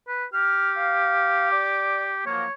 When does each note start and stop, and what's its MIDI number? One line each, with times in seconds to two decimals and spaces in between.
0.08 0.25 71
0.34 2.26 67
0.34 0.72 89
0.77 1.50 77
1.51 2.09 74
1.51 2.09 86
2.27 2.44 53
2.27 2.44 54
2.27 2.44 58
2.27 2.53 73